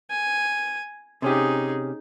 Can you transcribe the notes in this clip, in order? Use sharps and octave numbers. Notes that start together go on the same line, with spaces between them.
G#5
C3 C#4 D#4 G4 G#4